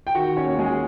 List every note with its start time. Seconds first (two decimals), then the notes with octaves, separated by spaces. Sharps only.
0.07 G5
0.15 D#3 F#4 F#5
0.37 C#4 C#5
0.44 D#2
0.59 G#3 G#4